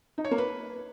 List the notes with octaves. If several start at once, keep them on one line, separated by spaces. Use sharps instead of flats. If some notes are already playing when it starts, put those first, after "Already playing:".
D#4
C#5
A#3
B4